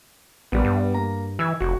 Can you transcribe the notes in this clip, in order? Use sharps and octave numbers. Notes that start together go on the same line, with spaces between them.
A#1 G3 B3
G2
A#3 A#5
E3 E6 G#6
F1 F#4